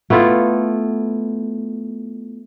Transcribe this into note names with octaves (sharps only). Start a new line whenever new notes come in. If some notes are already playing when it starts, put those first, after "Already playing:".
A3 B3 E4 F4